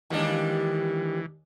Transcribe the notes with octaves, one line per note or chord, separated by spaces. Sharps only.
D#2 E3 G3 G#3 A#3 D4